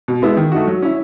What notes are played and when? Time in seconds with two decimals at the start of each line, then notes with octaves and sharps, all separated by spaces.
0.08 B2
0.22 G#3 B3 E4
0.37 D#3
0.52 A3 D#4 F#4
0.68 F#3
0.82 C#4 E4